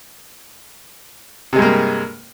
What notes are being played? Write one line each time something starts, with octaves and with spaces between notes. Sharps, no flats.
G2 C3 G#3 A#3